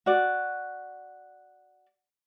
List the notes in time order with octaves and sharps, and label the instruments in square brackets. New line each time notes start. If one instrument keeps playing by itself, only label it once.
[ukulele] F#4 D5